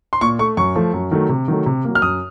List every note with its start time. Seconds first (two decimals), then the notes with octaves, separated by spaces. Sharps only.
0.13 C6
0.21 A#2 C#6
0.39 A3 C#6
0.57 F#2 C#6
0.75 F3 A3
0.93 F#2
1.11 D#3 F#3 A3
1.29 C3
1.48 D#3 F#3 A3
1.66 C3
1.85 F#3 A#3
1.95 F6
2.02 F#2 D#6